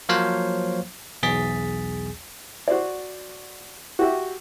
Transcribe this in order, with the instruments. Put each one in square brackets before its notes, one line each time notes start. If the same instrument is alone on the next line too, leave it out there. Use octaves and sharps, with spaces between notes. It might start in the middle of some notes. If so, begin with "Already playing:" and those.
[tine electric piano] F3 F#3 A#3 C5 C#5 F5
B1 E2 G#4 A6 B6
[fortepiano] F#4 C5 D5
F#4 G4 E5